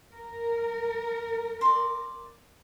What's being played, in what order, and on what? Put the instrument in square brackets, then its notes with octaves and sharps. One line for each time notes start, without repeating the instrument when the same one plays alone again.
[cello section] A#4
[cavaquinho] D5 C6